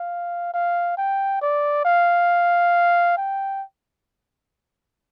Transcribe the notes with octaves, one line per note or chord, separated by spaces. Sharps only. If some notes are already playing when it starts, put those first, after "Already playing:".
Already playing: F5
F5
G5
D5
F5
G5